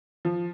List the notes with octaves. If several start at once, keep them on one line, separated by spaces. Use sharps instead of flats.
F3